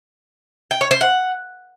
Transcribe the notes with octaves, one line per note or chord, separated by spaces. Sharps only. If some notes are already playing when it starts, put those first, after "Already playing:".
G5
C#5
C5
F#5